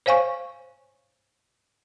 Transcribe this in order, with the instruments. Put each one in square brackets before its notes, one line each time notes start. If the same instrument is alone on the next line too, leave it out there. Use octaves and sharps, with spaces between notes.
[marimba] C5 C#5 F5 G#5 C#6